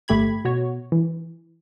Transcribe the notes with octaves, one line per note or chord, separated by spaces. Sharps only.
G1 A3 G4 B5 G#6
B2 F#4 C#5
E3